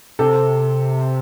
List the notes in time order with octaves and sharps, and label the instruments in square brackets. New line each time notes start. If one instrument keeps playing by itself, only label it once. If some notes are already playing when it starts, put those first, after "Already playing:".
[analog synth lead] C3 [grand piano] A4